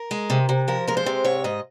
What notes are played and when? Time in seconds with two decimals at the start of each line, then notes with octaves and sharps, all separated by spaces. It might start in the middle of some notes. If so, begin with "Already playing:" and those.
Already playing: A#4
0.11 G#3
0.30 C3
0.49 C3
0.68 F3 A#4
0.88 G#3 A#4
0.97 C5
1.06 C3
1.25 G#2 C#5
1.44 G#2 D#5